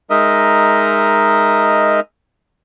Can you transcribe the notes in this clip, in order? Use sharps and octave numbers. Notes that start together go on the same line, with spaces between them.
G#3 D#4 A#4 D#5 E5